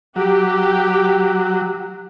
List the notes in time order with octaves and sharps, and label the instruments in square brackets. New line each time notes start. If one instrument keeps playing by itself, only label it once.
[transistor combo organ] F#3 [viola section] G4